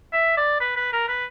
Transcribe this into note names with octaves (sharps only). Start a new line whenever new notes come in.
E5
D5
B4
B4
A#4
B4